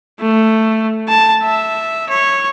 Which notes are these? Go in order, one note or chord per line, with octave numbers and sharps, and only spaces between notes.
A3
A5
E5
C#5